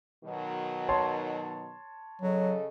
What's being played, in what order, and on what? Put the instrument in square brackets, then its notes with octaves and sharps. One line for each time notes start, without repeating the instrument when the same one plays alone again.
[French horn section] B2 D#3 F#3
[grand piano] C#5 A5 C6
[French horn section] C#3 A4 D#5 [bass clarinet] F#3